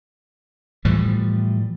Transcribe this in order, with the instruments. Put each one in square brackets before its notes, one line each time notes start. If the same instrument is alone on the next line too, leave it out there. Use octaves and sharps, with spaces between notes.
[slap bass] A2 E3 F3 G3